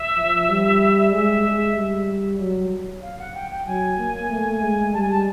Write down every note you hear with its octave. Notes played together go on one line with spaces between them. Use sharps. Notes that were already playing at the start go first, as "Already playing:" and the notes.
Already playing: E5
F3
G3
G#3 E5
G#3
G3
F#3
F5
F#5
G5
G5
F#3 G#5
A#3
A3
G#3
G3 A5
G#5
A5